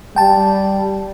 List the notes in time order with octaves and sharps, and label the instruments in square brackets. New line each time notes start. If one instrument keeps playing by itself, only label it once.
[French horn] G3 [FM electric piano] G5 A5